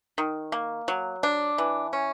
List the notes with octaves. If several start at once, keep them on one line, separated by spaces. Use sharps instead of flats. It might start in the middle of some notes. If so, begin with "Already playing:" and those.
D#3
A#3
F#3
D4
E3
C#4